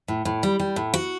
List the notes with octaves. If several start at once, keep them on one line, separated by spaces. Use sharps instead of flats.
A2
A2
G3
G3
A2
F#4